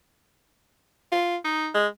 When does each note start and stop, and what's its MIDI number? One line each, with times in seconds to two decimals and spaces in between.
1.12 1.36 65
1.45 1.69 63
1.75 1.87 56